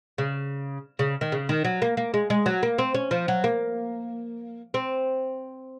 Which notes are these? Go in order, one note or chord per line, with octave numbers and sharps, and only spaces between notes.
C#3
C#3
D#3
C#3
D#3
F#3
A#3
A#3
G#3
G#3
F#3
A#3
C4
C#4
F3
F#3
A#3
C4